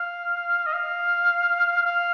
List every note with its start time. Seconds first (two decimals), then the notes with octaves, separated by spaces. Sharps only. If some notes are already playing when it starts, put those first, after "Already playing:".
Already playing: F5
0.66 D#5
0.74 F5
1.85 F5